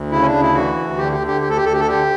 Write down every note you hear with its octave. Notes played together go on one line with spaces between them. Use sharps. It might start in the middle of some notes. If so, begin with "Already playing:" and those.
Already playing: D2
C#3 E4
C#4
D4
D2
E4
E3 F#4
D2
D3 G4
G4
D3
G4
D2 G4
A4
G4
D2 A4
G4
A4
D3 G4